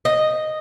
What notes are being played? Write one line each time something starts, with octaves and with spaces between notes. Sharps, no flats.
D#5